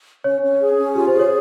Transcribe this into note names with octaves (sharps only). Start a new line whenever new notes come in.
C#4 C#5
C#4
G#4
C#4
F4 G4
C5
G#4
C#5